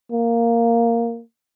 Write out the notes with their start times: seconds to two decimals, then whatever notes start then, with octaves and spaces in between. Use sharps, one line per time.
0.12 A#3